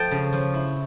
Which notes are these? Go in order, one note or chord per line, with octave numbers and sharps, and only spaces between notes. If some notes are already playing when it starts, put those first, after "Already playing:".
Already playing: F3 A3 G5 A5
C#3
F3
E4